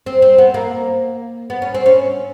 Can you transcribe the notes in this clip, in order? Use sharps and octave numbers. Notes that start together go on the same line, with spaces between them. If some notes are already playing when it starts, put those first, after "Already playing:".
C4
C4
B3
A#3
B3
C#4
C4
C#4